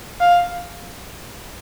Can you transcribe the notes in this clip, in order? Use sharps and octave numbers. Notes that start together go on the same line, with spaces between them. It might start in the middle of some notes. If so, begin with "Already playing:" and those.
F5